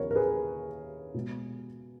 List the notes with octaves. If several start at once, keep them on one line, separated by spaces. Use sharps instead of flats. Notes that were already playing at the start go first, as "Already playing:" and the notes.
Already playing: D#2 C#3 F3 B3 A#4 C#5
A#4
G#4 B4
B2 G#3 B3